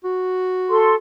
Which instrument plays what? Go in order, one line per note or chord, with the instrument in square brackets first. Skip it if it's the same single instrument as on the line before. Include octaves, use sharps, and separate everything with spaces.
[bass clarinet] F#4
[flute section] A4 C6